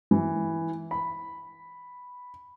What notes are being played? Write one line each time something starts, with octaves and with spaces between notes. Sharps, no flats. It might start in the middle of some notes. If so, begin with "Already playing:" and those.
E3
B5